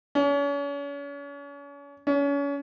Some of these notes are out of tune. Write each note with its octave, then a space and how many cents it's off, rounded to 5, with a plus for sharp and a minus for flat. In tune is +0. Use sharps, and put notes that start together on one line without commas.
C#4 +40
C#4 +35